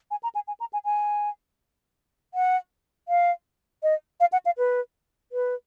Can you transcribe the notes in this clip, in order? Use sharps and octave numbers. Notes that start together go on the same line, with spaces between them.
G#5
A#5
G#5
G#5
A#5
G#5
G#5
F#5
F5
D#5
F5
F#5
F5
B4
B4